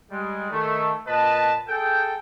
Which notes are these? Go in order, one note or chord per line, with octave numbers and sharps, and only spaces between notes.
G3 G#3
D#3 A3
A#2 B4 D#5 A5
G#4 A4 G5